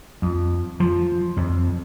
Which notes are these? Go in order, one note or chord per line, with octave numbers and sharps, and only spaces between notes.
F2
F3
F2